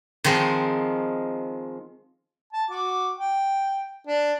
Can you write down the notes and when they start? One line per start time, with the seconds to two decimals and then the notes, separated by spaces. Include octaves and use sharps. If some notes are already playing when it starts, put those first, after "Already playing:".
0.24 D#3 F3 G#3 C4
2.53 A5
2.70 F#4 D6
3.18 G5
4.07 D4